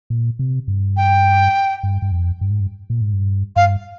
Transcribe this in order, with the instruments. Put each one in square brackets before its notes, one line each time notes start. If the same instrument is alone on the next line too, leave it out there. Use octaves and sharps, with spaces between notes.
[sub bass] A#2
C3
G2
[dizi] G5
[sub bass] G2
G2
F2
G2
G#2
G2
A#2
G#2
G2
[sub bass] G2 [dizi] F5